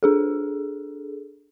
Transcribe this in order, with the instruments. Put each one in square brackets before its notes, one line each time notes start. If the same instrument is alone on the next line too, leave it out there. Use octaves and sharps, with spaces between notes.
[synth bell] D4 G#4 A4